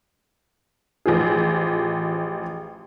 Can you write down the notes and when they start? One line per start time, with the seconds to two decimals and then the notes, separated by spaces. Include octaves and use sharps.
1.06 A1 F3 G#4